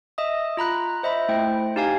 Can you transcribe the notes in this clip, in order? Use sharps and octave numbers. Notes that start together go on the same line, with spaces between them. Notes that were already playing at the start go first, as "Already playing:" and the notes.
D#5 E5 D#6
F4 A#5 B5 F#6
C5 D#5 E5 B5
A3 E4 C5 G5
C5
D#4 G4 F5 G#5 G#6